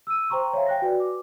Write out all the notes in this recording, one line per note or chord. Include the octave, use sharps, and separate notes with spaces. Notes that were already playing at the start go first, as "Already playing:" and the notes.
E6 D#7
C5 G5 A#5 C6 C#6
C#5 E5 F5 G#5
G5 F#6 A#6
F#4 B4 D5 G#5
D6